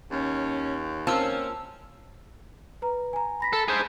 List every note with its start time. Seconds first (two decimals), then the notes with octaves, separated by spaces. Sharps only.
0.11 D#2 C#4
1.07 A#3 C4 C#4 F4 C5 A5 E6
2.82 B4 A#5
3.13 G#5 A#5
3.40 B5 A#6 B6
3.53 A4
3.68 G#4 C5